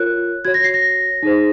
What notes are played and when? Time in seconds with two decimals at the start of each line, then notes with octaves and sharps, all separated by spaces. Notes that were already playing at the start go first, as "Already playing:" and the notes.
Already playing: F4 A#4 C#5 F#6
0.45 F#4 C#5 G#6
0.54 A#6
0.64 C7
0.74 A#6
1.23 D#4 G#4 C5